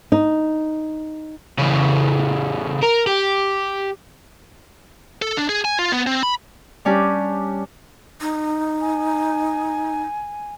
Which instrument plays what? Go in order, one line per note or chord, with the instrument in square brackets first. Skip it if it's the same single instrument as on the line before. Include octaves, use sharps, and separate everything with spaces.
[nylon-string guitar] D#4
[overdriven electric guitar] C#3 E3
A#4
G4
[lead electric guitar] A4
D4
G#4
G#5
F4
B3
C4
B5
[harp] G3 C#4 D4 G4
[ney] D#4
[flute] G#5